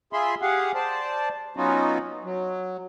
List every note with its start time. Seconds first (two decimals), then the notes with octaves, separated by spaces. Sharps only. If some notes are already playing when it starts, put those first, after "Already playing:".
0.13 F4 G#4 E5 B5 C6
0.42 G4 G#4 F5 F#5
0.75 C5 D5 A5
1.57 F#3 B3 C#4 D#4 F4 F#4
2.24 F#3